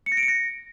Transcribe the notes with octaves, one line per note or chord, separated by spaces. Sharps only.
C#7
A#6
D7
C#7
A#6